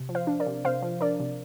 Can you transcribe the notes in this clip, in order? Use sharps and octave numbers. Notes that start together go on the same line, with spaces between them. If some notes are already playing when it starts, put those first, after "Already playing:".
Already playing: C3
F3
C5 F5
D4
A#4 D5
C3
C3 C5 F5
F3
D4 A#4 D5
C3